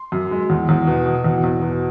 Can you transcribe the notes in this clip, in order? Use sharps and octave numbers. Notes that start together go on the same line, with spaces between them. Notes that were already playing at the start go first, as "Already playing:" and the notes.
Already playing: C6
F#2
G#3
E2
E2
B2
B2
E2
E2
B2